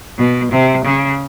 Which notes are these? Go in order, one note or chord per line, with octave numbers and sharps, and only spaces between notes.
B2
C3
C#3